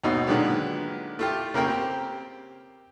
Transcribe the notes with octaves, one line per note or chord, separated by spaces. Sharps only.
D#2 G#2 B2 D#4
A#2 D3 D#3 F#3 G#3 B3
A3 F4 G4
C#3 A#3 A#4 G5
C4 G4